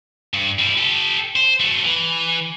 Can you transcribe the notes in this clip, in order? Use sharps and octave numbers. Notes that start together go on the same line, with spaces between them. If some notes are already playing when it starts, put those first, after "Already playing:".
G2
G3 E4
G4 A4
C5
F#3 A3
E3